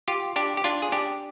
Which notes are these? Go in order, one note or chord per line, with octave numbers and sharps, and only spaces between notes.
F4 G4
D4 G4
G4
D4 F4
G#4
D4 G4